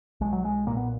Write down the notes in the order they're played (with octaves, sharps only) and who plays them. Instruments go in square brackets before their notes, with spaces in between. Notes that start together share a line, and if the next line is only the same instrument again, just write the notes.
[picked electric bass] B1 G#3
F#3
G#3
A#2 A#3
B3